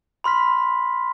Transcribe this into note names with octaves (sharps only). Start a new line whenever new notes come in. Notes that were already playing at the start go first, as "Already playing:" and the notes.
B5 C6 F6 B6